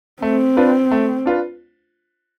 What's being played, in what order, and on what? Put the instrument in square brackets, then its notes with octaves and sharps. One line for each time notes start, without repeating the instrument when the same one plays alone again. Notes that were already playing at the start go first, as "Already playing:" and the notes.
[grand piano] A3 [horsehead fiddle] C4
[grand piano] D4 F4 B4
A3
D4 F4 B4